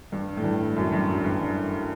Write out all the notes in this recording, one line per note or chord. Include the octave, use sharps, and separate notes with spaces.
G2
A2
G2
F#2
G2
F#2
G2